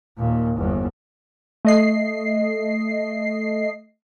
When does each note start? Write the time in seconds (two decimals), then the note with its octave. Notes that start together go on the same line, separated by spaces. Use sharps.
0.17 D#2 A#2
0.57 G1 E2
1.65 A3 D#5 C7